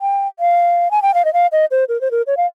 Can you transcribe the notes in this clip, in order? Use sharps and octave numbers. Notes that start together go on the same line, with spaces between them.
G5
F5
G#5
G5
F5
D#5
F5
D#5
C5
A#4
C5
A#4
C#5
F5